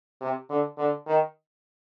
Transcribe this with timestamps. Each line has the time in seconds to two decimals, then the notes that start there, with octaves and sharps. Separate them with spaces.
0.21 C3
0.49 D3
0.78 D3
1.07 D#3